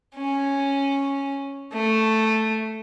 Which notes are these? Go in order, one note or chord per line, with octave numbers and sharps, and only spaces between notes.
C#4
A3